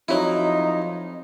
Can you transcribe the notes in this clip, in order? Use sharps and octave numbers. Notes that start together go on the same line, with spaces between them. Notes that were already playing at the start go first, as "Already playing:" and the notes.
F2 F#3 D#4 E4